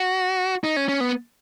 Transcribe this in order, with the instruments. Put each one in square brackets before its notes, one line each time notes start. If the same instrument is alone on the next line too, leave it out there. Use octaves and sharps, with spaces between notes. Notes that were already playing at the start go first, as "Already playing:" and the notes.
Already playing: [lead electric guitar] F#4
D#4
C#4
C#4
B3